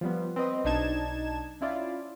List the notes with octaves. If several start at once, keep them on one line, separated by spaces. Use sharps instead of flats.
F3 G3 B3
C4 B4 D#5
B1 D4 D#4 A5 G#6 E7
C#4 E4 F4 D5